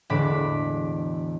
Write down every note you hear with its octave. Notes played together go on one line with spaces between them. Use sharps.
E1 A2 D3 B5 D6